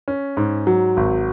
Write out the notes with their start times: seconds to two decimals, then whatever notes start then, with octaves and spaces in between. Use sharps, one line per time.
0.08 C#4
0.37 G#2
0.67 F#3
0.97 G#1